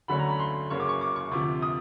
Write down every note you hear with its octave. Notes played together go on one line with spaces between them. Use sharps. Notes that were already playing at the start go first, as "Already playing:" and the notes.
D2 D3 F#3 A3 C#4 B5
A#5
B5
C6
F#2 C#3 F#3 A#3 C#4 C#6
D6
C#6
D6
C#6
D2 C3 F3 D6
D#6